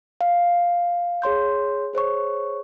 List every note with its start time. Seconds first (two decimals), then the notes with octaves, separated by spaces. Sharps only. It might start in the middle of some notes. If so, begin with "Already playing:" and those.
0.21 F5
1.22 G#4 C#5 C6 G6
1.93 G#4 C5 C#5 C#6